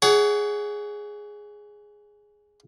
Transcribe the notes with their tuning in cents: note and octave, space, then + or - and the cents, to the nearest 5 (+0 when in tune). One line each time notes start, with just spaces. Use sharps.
G#4 +0 C#5 +35 F#5 +20